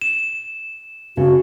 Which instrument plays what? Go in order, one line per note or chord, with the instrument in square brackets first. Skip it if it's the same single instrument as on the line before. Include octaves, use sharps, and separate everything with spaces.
[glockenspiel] E7
[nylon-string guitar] C#3 [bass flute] F#4